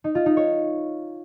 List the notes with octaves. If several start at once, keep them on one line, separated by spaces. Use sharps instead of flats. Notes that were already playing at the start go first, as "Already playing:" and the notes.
D#4
F4
D#4
C#5